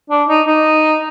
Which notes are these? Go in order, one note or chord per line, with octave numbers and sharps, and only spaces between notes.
D4
D#4
D#4